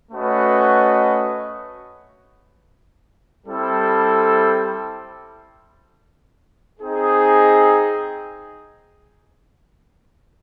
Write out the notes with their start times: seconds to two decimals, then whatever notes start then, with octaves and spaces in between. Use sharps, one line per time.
0.12 A3 C#4 F#4 B4 D#5
3.46 G3 C4 E4 A4
6.80 C4 D#4 G#4